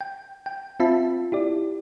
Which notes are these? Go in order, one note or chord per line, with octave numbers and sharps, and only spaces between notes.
G5
G5
C4 F4 E5 A5 B5
E4 G4 D5